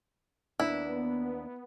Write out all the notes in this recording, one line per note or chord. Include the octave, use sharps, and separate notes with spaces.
D#2 B3 D4 E4